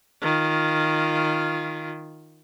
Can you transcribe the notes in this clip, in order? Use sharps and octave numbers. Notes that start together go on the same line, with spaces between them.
D#3 F4